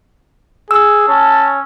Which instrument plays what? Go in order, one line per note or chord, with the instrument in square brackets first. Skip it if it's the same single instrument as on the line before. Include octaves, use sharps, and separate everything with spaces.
[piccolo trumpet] G#4 [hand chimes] E6
[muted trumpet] C#4 [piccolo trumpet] A5